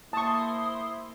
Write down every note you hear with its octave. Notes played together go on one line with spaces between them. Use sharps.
A#3 E4 C5 A5 C6 C#6 D#6